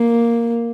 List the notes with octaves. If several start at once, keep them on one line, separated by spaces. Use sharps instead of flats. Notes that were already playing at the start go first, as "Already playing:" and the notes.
Already playing: A#3